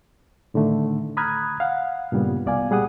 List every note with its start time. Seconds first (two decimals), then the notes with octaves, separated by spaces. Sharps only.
0.54 A2 D3 D#3 A3
1.17 A#5 B5 D#6 F6 F#6 G#6
1.60 F5 F#5
2.12 G2 A#2 C#3 G3 B3
2.46 C2 B3 D5 F5 G#5
2.70 A#2 G3 G#4 F#5 D#6